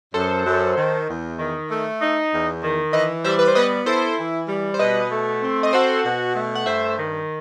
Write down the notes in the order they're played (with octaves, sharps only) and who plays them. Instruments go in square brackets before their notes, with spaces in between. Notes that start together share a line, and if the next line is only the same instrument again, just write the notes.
[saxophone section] F#2 [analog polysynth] A4 C5
[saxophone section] F#2
D#3
E2
D#3
A3
D#4
E2
D#3
[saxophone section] E3 [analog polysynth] B4 D#5
[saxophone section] G3 [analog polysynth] C5 E5
[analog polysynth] B4
C5
[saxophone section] B3 [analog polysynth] B4 D#5
[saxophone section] E4 [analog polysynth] A4 C5
[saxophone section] E3
G3
[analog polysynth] C5
[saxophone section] B2 [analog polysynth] B4 D#5
[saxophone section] A3
C4
[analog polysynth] D#5
[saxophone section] F#4 [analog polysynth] A4 C5
[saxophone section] B2
A3
[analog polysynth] F#5
[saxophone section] G2 [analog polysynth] C5 E5
[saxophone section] D#3